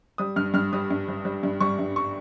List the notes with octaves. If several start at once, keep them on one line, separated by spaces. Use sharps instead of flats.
G3 D#6
G2 F6
G2 F6
G3 D#6
G2
G3
G3
G2
G3 C#6
G2
C#6